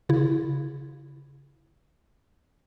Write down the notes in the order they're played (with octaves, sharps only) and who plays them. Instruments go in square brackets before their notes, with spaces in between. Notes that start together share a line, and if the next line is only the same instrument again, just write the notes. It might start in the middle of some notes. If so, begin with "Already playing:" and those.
[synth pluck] C#3 E4